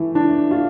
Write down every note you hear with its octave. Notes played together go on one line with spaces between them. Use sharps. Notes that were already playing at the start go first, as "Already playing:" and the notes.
Already playing: E3 A3
D4
F4